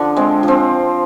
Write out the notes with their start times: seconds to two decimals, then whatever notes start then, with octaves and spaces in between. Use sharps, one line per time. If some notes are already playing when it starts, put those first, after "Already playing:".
Already playing: D3 F3 D4
0.16 G#3 C4
0.43 F3
0.48 C4